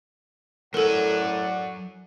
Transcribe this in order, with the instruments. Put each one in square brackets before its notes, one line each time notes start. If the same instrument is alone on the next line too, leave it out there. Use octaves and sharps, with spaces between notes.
[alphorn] A2 [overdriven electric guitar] F#3 G#5 [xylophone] A4 A#4 [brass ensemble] D5 F#5